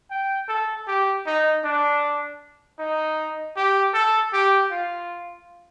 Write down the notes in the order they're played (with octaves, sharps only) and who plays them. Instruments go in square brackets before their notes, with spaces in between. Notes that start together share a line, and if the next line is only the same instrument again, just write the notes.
[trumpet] G5
A4
G4
D#4
D4
D#4
G4
A4
G4
F4